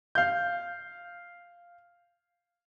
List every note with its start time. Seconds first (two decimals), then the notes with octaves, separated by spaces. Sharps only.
0.15 F5 G6